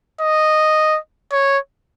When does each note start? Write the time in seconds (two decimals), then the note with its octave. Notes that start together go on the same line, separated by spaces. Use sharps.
0.21 D#5
1.32 C#5